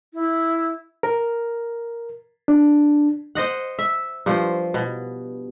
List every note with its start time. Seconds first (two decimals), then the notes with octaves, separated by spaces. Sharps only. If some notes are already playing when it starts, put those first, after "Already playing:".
0.14 E4
1.03 A#4
2.48 D4
3.35 C5 D#5 F#5
3.79 E5
4.26 G2 F3 C5
4.74 B2